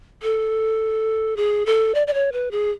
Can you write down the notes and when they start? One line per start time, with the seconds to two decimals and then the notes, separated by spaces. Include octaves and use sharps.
0.23 A4
1.37 G#4
1.66 A4
1.95 D5
2.07 D5
2.14 C#5
2.32 B4
2.51 G#4